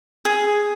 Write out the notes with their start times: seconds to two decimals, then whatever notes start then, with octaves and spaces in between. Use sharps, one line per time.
0.25 G#4